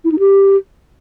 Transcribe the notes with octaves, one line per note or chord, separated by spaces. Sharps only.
E4
D#4
G4